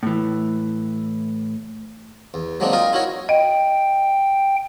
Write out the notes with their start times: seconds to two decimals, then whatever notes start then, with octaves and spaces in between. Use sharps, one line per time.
0.03 A2 E3
2.34 E2
2.60 F#3 G#3 A#3 C4 D4 D#4
2.73 F4 A#4 D#5 F5 G5
2.93 D#4 E4 F#4 A#4 C#5
3.29 D#5 G5